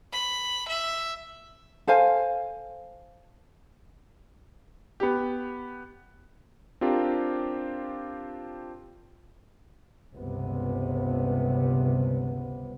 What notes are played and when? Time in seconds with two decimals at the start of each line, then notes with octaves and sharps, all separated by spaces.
0.13 B5
0.68 E5
1.88 A4 C5 F5 G#5
5.00 B3 G4
6.81 C4 D4 F4 G4 A#4 C5
10.14 G1 C#2 G2 C3 B3